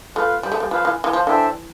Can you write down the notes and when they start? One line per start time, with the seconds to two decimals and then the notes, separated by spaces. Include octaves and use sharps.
0.15 A3 F4 B4 F5
0.43 G3
0.52 A3
0.60 G3
0.71 F3 F4 B4 F5
0.85 E3
1.04 E3
1.13 F3
1.27 E3 D4 A4 C5 E5 G5